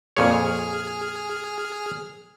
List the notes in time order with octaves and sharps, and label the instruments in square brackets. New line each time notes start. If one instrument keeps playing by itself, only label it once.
[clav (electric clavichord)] F2 A#2 C#5 [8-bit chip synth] G#4 F6